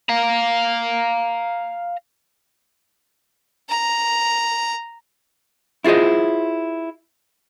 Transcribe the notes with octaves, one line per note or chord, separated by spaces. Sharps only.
F5 A#5
A#5
E4 F4 G#4 C5 D#5